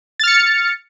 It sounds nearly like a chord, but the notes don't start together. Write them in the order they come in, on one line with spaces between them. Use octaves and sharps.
A6 F6 C#7